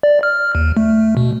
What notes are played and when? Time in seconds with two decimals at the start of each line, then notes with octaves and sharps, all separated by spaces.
0.03 D5
0.23 F6
0.55 D#2
0.77 A3
1.17 B2